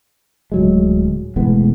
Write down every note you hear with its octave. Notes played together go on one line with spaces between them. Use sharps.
D1 F#3 G#3
E1 A2 G#3 B3